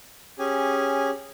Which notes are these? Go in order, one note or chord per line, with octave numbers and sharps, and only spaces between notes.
C#4 G4 G#4 G#5